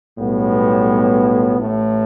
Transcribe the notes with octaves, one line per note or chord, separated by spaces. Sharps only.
B1 A2 G3 B3
A1 A2 A3